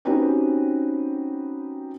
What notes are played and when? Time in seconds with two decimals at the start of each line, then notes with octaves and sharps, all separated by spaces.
0.05 C4 C#4 D#4 F#4 G4 B4